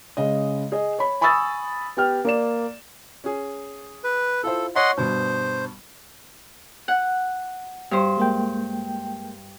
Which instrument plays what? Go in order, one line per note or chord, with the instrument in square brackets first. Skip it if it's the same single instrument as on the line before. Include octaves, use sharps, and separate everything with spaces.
[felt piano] C#3 G#3 D#5
G#4 D#5
C#5 B5
G#5 B5 C#6 D#6 E6 A6
B3 G4 G5 F6
A#3 D5 E7
C#4 G#4
[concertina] B4
[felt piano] E4 F4 C5 [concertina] A4
[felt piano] C#5 C#6 B6 [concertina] D#5 F#5 C6
[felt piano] G2 B2 [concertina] C5
[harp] F#5
G2 C5
[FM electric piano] G#3 A#3 G5